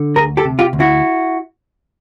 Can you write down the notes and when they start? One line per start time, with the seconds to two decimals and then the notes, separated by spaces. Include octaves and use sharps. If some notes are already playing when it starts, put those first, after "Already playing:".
Already playing: D3
0.16 D2 G#4 A#4
0.37 G4 A4
0.45 C3
0.59 F4 G4
0.73 D2
0.80 E4 F#4